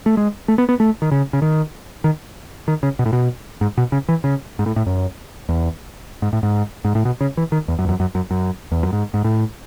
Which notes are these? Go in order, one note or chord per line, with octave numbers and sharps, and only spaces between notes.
A3
G#3
A3
B3
B3
A3
D#3
C#3
C#3
D#3
D#3
D#3
C#3
B2
A2
B2
G#2
B2
C#3
E3
C#3
G#2
A2
A2
F#2
E2
G#2
A2
G#2
G#2
A2
B2
C#3
E3
D#3
E2
F#2
E2
F#2
F#2
F#2
F#2
E2
F#2
G#2
G#2
A2